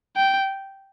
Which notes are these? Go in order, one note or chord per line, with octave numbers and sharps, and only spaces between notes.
G5